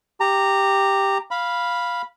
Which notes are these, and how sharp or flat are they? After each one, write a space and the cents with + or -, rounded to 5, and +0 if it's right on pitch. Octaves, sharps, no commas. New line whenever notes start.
G4 +5 A#5 -15
F5 +0 B5 -10